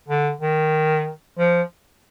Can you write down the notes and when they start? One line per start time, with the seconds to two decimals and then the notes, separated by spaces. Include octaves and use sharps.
0.08 D3
0.41 D#3
1.39 F3